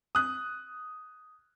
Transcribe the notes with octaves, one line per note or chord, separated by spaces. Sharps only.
D#6 F#6